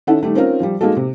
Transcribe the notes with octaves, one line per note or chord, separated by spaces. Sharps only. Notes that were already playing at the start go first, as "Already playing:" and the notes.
D#3 C#4 E4 A4 F#5
D#3 G3 A3
C4 C#4 D#4 F4 A#4
F3 G3
G#3 A#3 D#4 F#4 A4
C3